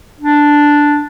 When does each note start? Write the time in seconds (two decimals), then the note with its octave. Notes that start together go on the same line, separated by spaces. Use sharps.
0.20 D4